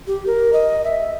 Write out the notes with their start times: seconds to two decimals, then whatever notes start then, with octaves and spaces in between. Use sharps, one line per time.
0.07 G4
0.26 A#4
0.53 D#5
0.84 E5